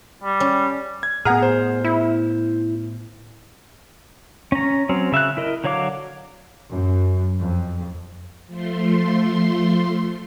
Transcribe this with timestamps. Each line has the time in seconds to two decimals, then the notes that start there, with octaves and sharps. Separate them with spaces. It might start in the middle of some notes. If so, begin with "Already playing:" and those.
0.24 G3
0.40 C#4
1.03 G#6
1.25 A2 B3 G#4 F#5 A#5 F6
1.42 C5
1.84 E4
4.52 C#4 A#5
4.89 F#3 C4 C#4
5.12 C#3 E5 F5 F#6
5.37 E4 A#4 D#5
5.64 D3 F#3 C#5 F5 D6
6.70 F#2
7.39 F2
8.47 F3 A3 C6